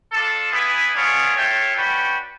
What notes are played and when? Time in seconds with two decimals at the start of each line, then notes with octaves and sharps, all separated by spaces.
0.12 D4 F4 A4
0.52 B3 E4 G#4 B4 E5
0.94 B3 D4 F4 G#4 C#5
1.34 F4 A4 C#5 E5 G5
1.75 C#4 F#4 B4 D5 G5